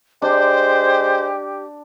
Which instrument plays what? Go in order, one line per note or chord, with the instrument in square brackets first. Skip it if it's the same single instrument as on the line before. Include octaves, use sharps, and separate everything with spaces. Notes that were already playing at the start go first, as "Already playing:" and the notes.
[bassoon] G#3 [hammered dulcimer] D4 [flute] G4 [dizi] C5